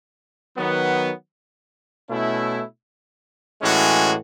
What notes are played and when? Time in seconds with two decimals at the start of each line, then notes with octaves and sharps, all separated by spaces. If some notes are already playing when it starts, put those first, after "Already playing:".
0.58 D#3 F#3 B3
2.09 B2 A3 C#4 E4
3.61 A2 E3 G#3 C#4 F#4